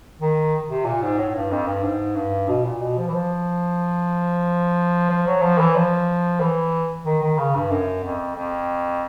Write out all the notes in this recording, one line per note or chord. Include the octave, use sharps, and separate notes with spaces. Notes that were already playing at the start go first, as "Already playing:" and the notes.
D#3
C3
A#2
G#2
A2
G2
F2
G2
G#2
G2
B2
A#2
B2
F3
E3
F3
F3
F#3
F3
E3
F3
E3
D#3
D#3
C#3
G2
F#2
F2
F2